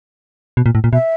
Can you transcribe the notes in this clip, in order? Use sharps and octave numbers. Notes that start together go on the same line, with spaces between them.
B2
A#2
A2
A#2
B2 E5